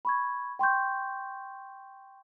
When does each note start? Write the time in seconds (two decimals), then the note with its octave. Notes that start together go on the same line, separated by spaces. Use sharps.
0.05 B5 C#6 G#6
0.59 G5 C6 C#6 G6